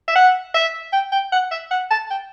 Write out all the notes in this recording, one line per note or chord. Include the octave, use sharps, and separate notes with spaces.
E5
F#5
E5
G5
G5
F#5
E5
F#5
A5
G5